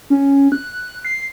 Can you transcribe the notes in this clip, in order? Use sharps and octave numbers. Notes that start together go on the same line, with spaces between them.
C#4
F#6
C7